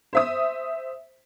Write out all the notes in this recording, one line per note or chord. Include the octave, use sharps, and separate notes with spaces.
C5 E5 D#6